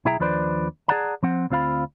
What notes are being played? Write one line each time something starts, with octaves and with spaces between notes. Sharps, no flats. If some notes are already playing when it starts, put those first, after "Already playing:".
B1 E4 G#4 E5 G5 A#5
D#2 F3 D4 B4 C5 D5
G#4 C5 D5 F#5 A5 A#5
F3 C4 F#5
D2 C4 F4 F5 B5